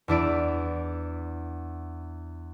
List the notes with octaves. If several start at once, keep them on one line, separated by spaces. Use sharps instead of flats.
E2 D4 E4 D7